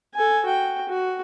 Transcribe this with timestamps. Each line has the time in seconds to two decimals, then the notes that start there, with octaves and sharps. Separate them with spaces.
0.14 A4 G#5
0.45 F#4 G5
0.89 F#4